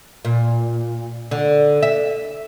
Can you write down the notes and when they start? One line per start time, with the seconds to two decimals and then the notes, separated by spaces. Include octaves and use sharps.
0.25 A#2
1.31 D3
1.83 E5